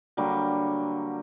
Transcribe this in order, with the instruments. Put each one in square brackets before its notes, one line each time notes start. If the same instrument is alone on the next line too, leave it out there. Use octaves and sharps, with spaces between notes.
[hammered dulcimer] D3 F#3 G3 A#3